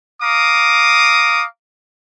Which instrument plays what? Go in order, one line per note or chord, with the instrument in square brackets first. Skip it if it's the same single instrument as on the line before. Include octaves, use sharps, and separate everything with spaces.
[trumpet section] F5 A#5 D6 D#6